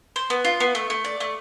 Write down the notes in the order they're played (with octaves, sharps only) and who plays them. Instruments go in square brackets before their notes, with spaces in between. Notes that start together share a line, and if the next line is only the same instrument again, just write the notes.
[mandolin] C5
B3
F4
B3
A3
A3
D5
A3